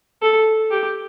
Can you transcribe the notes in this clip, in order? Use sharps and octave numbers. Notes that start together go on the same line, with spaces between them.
A4
G4